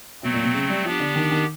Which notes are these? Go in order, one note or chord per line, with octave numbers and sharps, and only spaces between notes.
B2 F#3 A3 C4
A#2
B2
C#3
G3
F3 B3 D4 G4
D3
D#3
D#3